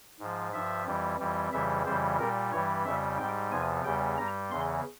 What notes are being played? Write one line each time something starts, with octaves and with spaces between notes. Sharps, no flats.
G#2 F3
G2 F3 E5
F2 E3 G3
F2 E3 G3
F2 C#3 E3 G3 E5
F2 C#3 E3 G3 C5
A#2 G3 A#4
G2 E3 G3 C#5
F2 C#3 G3 E5
G#2 G3 G5
E2 C3 F3 G#5
E2 C#3 G3 G5
G2 G3 A#5
E2 C#3 E3 C6